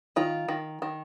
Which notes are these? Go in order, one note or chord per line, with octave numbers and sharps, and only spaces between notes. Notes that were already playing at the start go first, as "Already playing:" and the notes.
D#3 F4
D#3
D#3